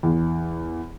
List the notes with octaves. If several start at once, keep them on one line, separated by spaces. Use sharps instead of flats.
E2